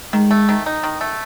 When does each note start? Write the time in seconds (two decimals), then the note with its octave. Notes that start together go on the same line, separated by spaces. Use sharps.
0.13 D#3 G#3
0.31 A3
0.49 D#3
0.66 D#4
0.83 D#3
1.01 A3